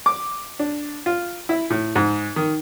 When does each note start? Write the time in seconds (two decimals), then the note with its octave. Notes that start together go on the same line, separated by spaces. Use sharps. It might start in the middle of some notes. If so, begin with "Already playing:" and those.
0.06 D6
0.59 D4
1.06 F4
1.49 E4
1.70 A2
1.95 G#2
2.36 D#3